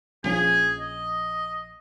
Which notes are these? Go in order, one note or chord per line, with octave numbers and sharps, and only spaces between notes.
A#1 F3 C#4 G#4
D#5